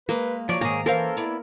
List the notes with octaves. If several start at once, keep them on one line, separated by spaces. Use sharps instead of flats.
G#3 A#3 B4
F3 F#3 C#5 D5
G#2 D#3 A#3 G#4 A#5
E3 C#4 A4 A#4 C5 F5 C6 E6
B3 E4 C#5 D5